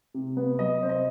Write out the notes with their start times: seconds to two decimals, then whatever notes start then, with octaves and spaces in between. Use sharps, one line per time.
0.14 C3
0.37 B3
0.59 F#3 D#5
0.82 C3 C5
0.89 D#5